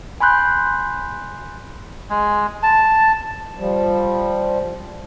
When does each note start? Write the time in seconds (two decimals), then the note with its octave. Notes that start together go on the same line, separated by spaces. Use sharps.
0.20 G#5 B5 C6 F#6 G6
2.10 G#3
2.63 A5
3.58 F3 G3